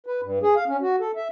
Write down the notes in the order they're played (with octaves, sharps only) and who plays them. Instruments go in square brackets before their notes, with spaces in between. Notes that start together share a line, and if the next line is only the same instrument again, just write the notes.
[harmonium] B4
G2
G#4
F5
C#4
F#4
A4
E5